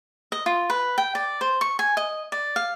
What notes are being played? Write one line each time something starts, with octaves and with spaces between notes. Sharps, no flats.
D#5
F4
B4
G5
D5
C5
C#6
G#5
D#5
D5
F5